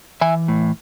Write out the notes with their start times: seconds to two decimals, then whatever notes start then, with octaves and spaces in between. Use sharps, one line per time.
0.21 E3 E5 G#5
0.48 A2